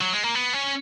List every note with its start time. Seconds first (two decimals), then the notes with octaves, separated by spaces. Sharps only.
0.01 F#3
0.13 G#3
0.23 A#3
0.35 B3
0.53 C#4